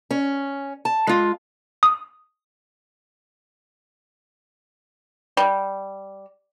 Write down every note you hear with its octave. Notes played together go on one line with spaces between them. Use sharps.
C#4
A5
G#3 F4
D#6
G3